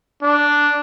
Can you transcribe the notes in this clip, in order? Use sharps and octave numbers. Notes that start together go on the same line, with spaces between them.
D4